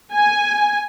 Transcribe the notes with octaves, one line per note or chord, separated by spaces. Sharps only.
G#5